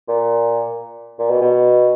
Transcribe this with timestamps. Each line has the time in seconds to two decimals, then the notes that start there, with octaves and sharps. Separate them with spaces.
0.08 A#2
1.19 A#2
1.30 B2
1.41 B2